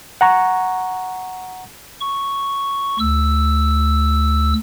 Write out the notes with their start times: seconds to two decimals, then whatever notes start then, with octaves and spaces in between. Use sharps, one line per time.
0.21 F#5 A#5 C#6
2.01 C#6
3.00 D2 E6